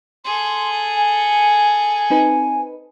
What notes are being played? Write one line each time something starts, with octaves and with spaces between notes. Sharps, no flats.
G#4 A4 C6
G#5
C4 D#4 B4